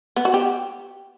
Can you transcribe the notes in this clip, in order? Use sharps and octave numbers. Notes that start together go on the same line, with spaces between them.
B3
F#4
G4